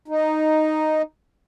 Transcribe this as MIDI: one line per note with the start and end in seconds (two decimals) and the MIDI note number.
0.08 1.02 63